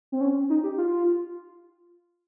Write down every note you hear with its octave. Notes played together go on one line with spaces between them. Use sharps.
C4
C#4
D#4
G4
F4